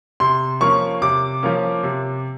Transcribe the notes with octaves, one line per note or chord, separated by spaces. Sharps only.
C3 C6
F3 A#3 C#4 C#6
C3 D6
F3 A#3 C#4
C3